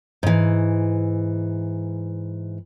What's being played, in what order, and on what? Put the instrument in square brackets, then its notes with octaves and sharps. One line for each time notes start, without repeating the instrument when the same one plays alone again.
[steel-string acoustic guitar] G#2 E3